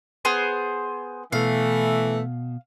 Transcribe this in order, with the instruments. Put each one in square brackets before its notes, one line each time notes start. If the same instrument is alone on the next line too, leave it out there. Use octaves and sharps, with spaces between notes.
[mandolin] B3 G#4 C5
[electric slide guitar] B2 [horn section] E3 A3 [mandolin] F5